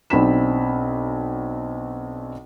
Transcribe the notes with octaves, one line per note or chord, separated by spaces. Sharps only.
B1 C4 D4 B5 B6 E7